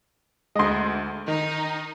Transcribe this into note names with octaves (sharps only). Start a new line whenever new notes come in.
D2 G#3 D#5 C6
D#3 D#4